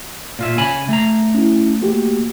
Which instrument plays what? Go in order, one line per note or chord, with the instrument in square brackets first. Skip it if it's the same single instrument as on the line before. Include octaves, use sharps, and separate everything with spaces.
[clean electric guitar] A#2 F4 E5
C#3 G#5 B5
A3 A#5
[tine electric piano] C#4 E4
A#3 F#4 G4